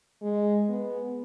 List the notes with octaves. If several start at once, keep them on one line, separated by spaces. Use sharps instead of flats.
G#3
B3